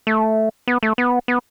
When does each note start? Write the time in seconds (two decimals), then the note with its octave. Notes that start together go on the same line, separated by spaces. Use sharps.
0.07 A3
0.68 B3
0.83 A3
0.98 B3
1.28 B3